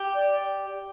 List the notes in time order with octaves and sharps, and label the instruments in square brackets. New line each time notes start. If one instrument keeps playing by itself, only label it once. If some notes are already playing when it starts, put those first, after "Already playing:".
Already playing: [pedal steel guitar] G4
[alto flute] D5